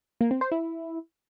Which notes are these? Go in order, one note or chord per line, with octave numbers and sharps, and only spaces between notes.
A#3
C4
C5
E4